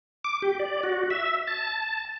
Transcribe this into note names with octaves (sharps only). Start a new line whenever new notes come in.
D6
G4
D5
F#4
E5
A5